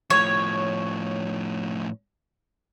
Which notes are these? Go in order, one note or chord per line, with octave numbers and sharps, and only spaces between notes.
A2 F3 C#5